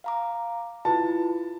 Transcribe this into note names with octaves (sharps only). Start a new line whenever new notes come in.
F5 A#5 D6
E4 F4 B4 A5